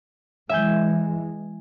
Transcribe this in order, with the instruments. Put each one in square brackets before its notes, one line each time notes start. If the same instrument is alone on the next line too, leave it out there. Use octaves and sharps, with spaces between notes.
[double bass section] E3 G#3 [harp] E5 G#5 G6